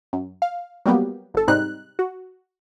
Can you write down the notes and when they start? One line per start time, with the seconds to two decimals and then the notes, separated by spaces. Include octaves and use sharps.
0.13 F#2
0.42 F5
0.86 F#3 G3 A#3 B3 G4
1.34 G1 A4
1.48 G#2 C3 G3 C4 D#4 F#6
1.99 F#4